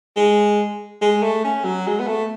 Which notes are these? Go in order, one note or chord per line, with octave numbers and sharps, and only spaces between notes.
G#3
G#3
A3
C#4
F#3
G#3
B3
A3